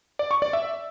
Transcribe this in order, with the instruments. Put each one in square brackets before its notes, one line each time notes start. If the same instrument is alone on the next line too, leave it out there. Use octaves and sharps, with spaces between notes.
[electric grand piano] D5
C#6
D5
E5